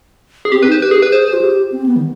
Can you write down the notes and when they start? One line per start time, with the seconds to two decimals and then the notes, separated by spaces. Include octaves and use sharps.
0.45 G#4
0.52 C4 G4
0.62 B4
0.67 D#4 C5
0.81 G4 B4
0.91 G#4
1.02 B4
1.12 G#4 C5
1.33 F4
1.41 G4
1.72 C4
1.86 B3
1.96 D#3